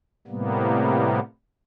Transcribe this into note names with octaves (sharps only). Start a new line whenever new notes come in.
A2 C3 G3 A#3 B3